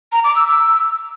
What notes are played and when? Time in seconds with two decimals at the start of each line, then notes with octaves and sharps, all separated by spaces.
0.12 A#5
0.24 D6
0.36 E6
0.47 E6